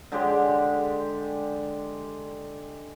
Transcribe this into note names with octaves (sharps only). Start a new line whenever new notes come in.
D3 G#3 G4